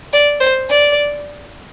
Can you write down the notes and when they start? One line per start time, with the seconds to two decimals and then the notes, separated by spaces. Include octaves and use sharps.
0.13 D5
0.40 C5
0.70 D5